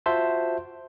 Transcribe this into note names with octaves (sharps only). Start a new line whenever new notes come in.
F4 F#4 C5 E5 A5 C6